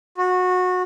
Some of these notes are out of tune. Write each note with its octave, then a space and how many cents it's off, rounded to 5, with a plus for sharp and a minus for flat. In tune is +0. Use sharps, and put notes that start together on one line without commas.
F#4 -20